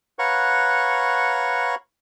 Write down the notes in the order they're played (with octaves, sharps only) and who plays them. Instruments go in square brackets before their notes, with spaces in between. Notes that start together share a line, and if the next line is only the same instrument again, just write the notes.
[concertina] B4 C#5 F5 F#5 A#5 C#6